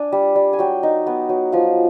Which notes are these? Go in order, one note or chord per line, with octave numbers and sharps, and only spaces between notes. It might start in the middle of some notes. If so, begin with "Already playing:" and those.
Already playing: D4 G#5
G3
G3
G#5
F#3 G5
D#4
B3
F#3
F3 F5